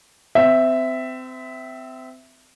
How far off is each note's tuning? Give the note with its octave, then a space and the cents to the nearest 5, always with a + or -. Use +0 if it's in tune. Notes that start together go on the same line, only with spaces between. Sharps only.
C4 -30 E5 +0